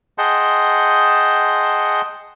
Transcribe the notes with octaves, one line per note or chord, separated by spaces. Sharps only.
G#4 D#5 F#5 G5 A5 C6